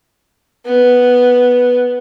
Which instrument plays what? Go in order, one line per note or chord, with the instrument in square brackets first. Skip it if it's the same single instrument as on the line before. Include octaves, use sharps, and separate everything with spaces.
[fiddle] B3